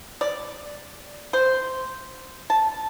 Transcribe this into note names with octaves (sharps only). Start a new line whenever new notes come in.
D5
C5
A5